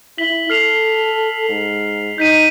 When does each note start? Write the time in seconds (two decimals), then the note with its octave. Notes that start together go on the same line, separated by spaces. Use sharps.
0.18 E4 B6 F#7 G7
0.50 A4 F6 C7 F7
1.49 G#2
2.18 D#4 G6 B6 D#7